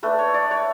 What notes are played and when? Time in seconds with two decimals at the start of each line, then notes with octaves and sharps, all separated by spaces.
0.03 A3 D4 B4
0.19 C#5
0.34 D5
0.51 C#5